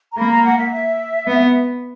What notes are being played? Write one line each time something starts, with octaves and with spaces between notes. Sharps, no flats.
A#5
A#3 B5
A#5
F#5
E5
E5
B3